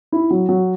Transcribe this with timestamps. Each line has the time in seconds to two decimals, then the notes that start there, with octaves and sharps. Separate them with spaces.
0.12 E4
0.30 F#3
0.49 F#3